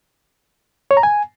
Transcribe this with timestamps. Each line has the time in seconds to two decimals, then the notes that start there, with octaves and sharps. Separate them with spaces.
0.91 C#5
0.97 A#5
1.03 G#5